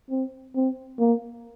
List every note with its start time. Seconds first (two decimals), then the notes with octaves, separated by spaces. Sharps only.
0.10 C4
0.56 C4
0.99 A#3